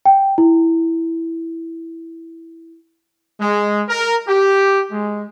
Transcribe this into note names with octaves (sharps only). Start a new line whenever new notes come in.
G5
E4
G#3
A#4
G4
G#3